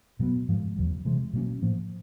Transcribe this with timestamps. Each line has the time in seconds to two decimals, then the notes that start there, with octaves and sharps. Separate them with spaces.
0.19 B2 F#3 B3
0.48 G#2 F3 G#3
0.76 E2 C#3 F#3
1.05 C3 E3 G#3
1.33 B2 F#3 A#3 C#4
1.62 A2 F3 A#3